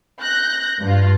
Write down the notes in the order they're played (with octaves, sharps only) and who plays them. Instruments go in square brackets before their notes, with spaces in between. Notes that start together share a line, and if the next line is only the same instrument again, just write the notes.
[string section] F#6 G6 A#6
G2 F4